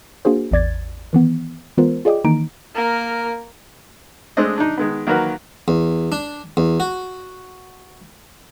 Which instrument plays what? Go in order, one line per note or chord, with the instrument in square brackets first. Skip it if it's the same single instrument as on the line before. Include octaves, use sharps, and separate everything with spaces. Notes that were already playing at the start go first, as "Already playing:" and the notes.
[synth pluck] A#3 D4 F#4 G#4 C5
A1 E2 D5 G#6 A6
D#3 E3 B3
E3 G#3 B3 F4 A#4 C5
F4 G#4 D5 D#5 G5 D6
D#3 E3 A#3 D#4 A#5 D7
[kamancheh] A#3 A#4
[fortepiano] G#3 A3 C4 D4 D#5
D4 D#4
D#3 G#3 B3
D#3 F#3 A#3 F#4 A#4 B4
[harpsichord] E2
D4
E2
F#4